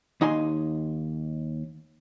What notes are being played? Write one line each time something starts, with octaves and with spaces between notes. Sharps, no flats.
D#2 D#4 G#5 C6